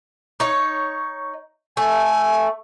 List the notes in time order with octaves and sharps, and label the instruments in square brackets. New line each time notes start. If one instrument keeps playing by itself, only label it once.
[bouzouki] D#4 C#5
[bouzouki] A3 [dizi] G#5